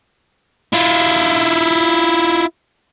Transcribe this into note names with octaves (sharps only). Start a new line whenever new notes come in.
E4 F4